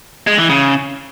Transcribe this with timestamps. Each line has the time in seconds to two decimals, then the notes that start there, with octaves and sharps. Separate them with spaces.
0.27 G#3
0.38 E3
0.49 C#3